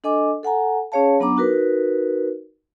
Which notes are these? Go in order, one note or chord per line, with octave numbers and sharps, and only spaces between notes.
D4 A4 D#5 G#5 D6
A4 F#5 G#5 A#5
C#4 G#4 C#5 F5 A5
F#3 B3 D4 A#5 D6
D#4 F#4 A#4 B4